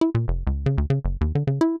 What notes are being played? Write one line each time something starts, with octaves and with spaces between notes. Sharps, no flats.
E4
A#2
F1
C#2
C#3
D2
C#3
F#1
D#2
D3
C#3
E4